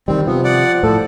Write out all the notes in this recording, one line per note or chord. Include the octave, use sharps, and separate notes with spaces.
D#3 G3 C4
C3 F3 B3
D5 F#5
A2 F3 A4